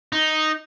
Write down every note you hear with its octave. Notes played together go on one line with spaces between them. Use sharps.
D#4